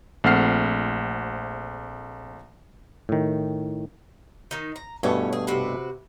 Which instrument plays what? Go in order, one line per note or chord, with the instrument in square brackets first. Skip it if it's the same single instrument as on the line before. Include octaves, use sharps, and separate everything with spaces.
[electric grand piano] A#1 A3 C4 F#5 F6 C7
[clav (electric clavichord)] A2 D#3
[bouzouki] D#3 D#4
A#5
[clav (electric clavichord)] G2 B2 A3 [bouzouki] E3 C#4 C#5
[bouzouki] G#4
C3 F#4 B4